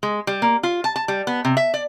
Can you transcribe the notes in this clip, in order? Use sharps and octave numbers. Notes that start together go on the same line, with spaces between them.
G#3
G3
A#3
F4
A5
A5
G3
B3
C3
E5
D5